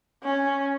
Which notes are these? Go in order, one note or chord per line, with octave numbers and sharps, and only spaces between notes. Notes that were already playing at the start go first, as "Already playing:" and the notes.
C#4